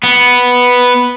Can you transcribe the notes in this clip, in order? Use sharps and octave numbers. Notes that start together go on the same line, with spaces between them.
B3